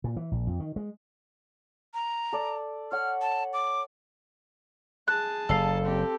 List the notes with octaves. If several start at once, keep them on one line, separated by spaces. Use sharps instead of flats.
A#2
E3
A#1
F2
D#3
G#3
A#5
A4 D5
C#5 F#5 F6
A5
D6
G#4 A5 F#6
F#1 A4 F5
C4 G4